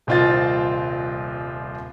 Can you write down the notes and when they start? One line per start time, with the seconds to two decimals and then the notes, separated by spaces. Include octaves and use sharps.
0.07 D#1 C2 C4 F4 D#5 A6